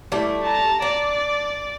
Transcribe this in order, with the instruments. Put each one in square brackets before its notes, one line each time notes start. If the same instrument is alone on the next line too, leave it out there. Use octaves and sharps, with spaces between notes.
[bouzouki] G3 A3 [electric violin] E4
[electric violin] A5 A#5
[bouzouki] D4 [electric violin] D5